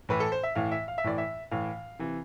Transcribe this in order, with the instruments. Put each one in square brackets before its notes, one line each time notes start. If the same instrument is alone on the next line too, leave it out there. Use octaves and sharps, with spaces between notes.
[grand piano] A2 E3 B4
A4
C5
E5
A2 E3 F5
E5
F5
E5
A2 E3 D5
E5
A2 E3 F5
C3 E3